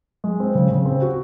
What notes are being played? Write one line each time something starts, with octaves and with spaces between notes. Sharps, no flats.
G#3
C4
C#3
C#3
C4
F#4